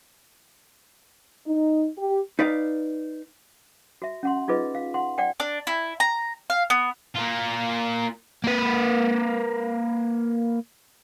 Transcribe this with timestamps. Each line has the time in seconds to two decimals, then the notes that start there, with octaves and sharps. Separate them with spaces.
1.46 D#4
1.97 G4
2.39 D#4 B4 D5 F5
4.02 F#4 E5
4.23 C#4 F#5 C6
4.48 D#4 F4 G#4 B4 D#5
4.75 F5
4.94 F#5 C6
5.18 D5 F#5 G5
5.40 D4
5.67 E4
6.00 A#5
6.50 F5
6.70 B3
7.15 A#3 F4
8.44 A#3 B4